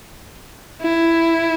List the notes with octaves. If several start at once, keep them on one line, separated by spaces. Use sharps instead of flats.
E4